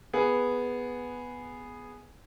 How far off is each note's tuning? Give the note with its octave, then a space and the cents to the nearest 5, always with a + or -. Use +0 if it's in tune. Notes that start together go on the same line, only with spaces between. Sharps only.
B3 +0 G#4 +0